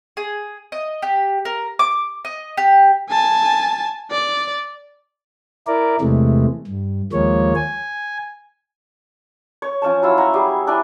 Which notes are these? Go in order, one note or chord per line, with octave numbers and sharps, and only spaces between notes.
G#4
D#5
G4
A#4
D6
D#5
G4
G#5 A5
D5
E4 A#4 D5
E2 C3 E3 G#3 A3
G2
D#2 F3 G#3 A#3 C#5
G#5
C#5
F3 C#4 C#5 A5
F#3 E4 F4 E6
E5 F#5 A#5
G3 G#4
D4 E4 D5 G#5